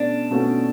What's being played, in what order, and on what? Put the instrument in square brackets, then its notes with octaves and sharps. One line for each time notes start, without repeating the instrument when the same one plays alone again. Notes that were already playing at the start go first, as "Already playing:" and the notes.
Already playing: [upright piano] B2 A3 C#4 [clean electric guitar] D4
[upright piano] B2 A3 C#4 F#4